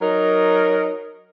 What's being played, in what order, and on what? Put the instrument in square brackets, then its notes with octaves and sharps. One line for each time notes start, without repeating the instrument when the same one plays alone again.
[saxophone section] F#3 D#4 A#4